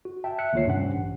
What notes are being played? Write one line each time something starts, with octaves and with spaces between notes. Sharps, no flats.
F#4
E5 G5 A5
E5 F#6 C#7
D2 D#3 A#3 F4 C#5 C7
G2 C3 C#4 F#5
A1